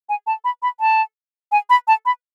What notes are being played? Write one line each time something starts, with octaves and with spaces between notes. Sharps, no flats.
G#5
A5
B5
B5
A5
G#5
B5
A5
B5